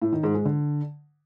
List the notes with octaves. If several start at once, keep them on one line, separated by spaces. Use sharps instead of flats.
A2
D#3
G#2
G#3
D3